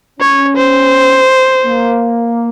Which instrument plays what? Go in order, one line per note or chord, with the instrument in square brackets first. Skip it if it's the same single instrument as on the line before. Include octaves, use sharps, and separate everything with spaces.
[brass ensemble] C#4 [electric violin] C#5
[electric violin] C5
[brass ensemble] A#3